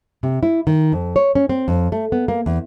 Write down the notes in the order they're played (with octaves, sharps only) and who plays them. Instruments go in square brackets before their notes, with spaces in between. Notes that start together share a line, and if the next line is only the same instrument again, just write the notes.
[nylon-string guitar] C3
E4
D#3
F2
C#5
C#4
C4
F2
A3
B3
A#3
E2